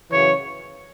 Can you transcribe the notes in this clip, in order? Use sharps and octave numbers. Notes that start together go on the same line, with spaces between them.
F#2 C#3 E3 C#5